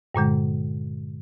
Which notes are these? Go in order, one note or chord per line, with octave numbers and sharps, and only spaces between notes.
G2 A#2 D3 G#3